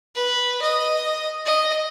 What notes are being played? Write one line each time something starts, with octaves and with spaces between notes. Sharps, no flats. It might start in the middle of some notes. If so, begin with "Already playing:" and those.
B4
D#5
D#5